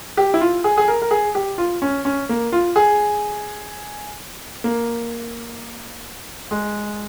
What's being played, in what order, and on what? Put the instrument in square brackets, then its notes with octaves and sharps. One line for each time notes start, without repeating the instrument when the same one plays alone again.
[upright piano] G4
E4
F4
G#4
G#4
A#4
A#4
G#4
G4
F4
C#4
C#4
A#3
F4
G#4
A#3
G#3